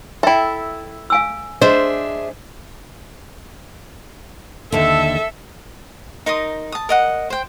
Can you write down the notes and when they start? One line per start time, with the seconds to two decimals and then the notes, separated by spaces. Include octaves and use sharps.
0.23 E4 A4 E5 G5
1.10 F5 G#5 E6
1.62 D4 G#4 C5 D#5 E5
4.72 D#2 D3 A4 E5
6.26 D#4 A#4 C6 D#6
6.72 A5 D#6
6.89 A#4 D#5 F#5
7.30 C5 G5